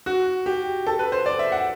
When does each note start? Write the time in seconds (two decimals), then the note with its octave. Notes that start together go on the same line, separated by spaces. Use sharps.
0.06 F#4
0.46 G4
0.87 A4
0.99 B4
1.12 C5
1.26 D5
1.39 E5
1.52 F#5